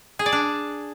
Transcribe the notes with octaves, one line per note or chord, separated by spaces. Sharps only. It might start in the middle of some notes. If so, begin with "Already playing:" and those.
G#4
D5
D4